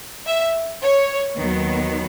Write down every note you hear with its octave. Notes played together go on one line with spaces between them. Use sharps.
E5
C#5
D#2 D#3 F#3 B3